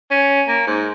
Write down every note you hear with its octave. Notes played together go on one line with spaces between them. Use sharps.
C#4
A#3
G#2